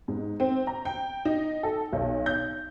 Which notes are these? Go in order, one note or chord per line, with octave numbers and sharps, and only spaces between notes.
G#2
C4
A#5
G5
D#4
A4
B1
G6